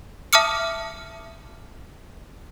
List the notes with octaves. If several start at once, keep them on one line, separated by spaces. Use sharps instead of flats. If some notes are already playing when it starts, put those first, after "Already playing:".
E5 A5 D6 D#6 F6 C#7